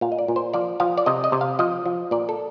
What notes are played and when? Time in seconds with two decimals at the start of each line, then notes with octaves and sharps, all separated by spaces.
0.01 A#2 F5
0.12 D#5
0.19 D5
0.28 A#2
0.36 C5
0.54 F3 D5
0.80 F3 F5
0.98 D5
1.06 C3 D#5
1.24 D#5
1.32 C3
1.41 F5
1.59 F3 D#5
1.86 F3
2.11 A#2 D5
2.29 A4